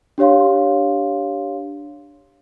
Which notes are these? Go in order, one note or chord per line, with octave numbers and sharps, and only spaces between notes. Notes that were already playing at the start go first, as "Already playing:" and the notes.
D4 G4 C#5 F5 C6